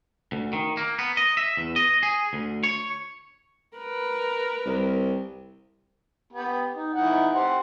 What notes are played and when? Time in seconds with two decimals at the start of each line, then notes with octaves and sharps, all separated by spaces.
0.32 D2
0.53 D#3
0.77 A#3
0.99 B3
1.17 D#5
1.37 E5
1.57 E2
1.76 D#5
2.03 G#4
2.33 D2
2.64 C#5
3.78 A#4 B4
4.66 C2
6.33 B3 G4
6.75 D#4
6.94 E3 D#4 F#5
7.33 G4 C5 F#5